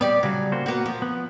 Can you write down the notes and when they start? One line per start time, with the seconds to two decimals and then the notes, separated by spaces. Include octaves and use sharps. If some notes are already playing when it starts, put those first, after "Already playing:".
0.01 G3 B3 G4 D5
0.23 C#3 F#3 G3
0.52 A#3 F#4 C5
0.66 A#3 B3 F#4
0.86 F3
1.02 B3